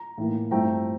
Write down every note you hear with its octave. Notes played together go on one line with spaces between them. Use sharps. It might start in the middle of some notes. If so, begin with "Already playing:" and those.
Already playing: A#5
A2 E3 A#3
G2 F3 A3 C4 E4 G5 A#5